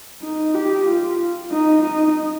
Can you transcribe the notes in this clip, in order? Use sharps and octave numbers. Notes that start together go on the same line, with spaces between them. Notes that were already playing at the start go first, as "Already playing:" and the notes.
D#4
G4
F4
D#4
D#4